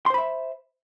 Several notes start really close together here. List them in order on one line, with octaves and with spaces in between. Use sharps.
C6 C5 B5 E5